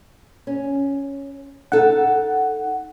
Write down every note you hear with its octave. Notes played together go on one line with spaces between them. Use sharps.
C#4
D#4 A4 F#5